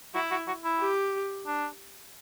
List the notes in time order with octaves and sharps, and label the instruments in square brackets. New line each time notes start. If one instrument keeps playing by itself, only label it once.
[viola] E4 [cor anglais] F#4
[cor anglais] F#4
F#4
E4
[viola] G4
[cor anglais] D4